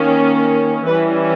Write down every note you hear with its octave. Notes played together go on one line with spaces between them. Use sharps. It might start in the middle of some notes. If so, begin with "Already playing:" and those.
Already playing: D#3 A#3 C#4
E3 G3 C#4 B4